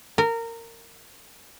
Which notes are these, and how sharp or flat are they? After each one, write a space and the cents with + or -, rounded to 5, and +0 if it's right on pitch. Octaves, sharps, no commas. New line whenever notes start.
A#4 -20